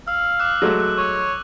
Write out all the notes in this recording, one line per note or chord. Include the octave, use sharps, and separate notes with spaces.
F5 E6
D6 E6 F#6
F#3 G#3 A3
F#6
C#5 C#6